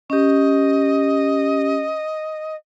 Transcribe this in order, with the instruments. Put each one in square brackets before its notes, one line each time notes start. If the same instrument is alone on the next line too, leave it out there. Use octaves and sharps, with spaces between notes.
[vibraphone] C#4 G4 [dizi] D#5